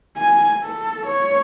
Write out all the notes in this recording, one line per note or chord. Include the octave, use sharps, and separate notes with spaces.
G#5
A4
C#5